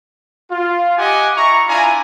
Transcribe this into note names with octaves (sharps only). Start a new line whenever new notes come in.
F4
G4 D#5 F#5 G#5 D6
E4 A#5 C#6
D4 E4 F4 D5 G#5 A#5